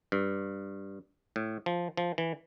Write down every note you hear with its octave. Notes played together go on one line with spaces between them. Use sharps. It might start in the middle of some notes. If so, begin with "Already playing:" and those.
G2
A2
F3
F3
E3